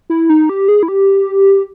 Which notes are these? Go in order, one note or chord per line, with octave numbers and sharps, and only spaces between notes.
E4
D#4
G4
G#4
E4
G4